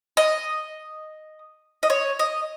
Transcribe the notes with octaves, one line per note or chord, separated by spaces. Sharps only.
D#5
D#5
C#5
D#5